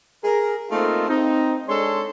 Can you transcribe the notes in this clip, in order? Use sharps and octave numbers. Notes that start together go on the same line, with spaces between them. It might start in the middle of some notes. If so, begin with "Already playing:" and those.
G#4 A#4
A3 A#3 C4 D#4 F4
C4 D#4
G#3 D4 A4 C#5 C6